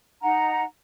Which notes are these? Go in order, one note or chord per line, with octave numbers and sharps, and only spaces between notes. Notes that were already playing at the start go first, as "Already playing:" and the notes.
D#4 F#5 A#5